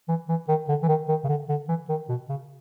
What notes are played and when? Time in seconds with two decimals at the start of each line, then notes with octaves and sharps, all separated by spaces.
0.08 E3
0.29 E3
0.48 D#3
0.68 D3
0.83 E3
0.88 D#3
1.08 D#3
1.24 C#3
1.29 D3
1.49 D3
1.68 E3
1.89 D#3
2.09 B2
2.29 C#3